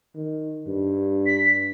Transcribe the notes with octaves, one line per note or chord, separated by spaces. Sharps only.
D#3
G2
B6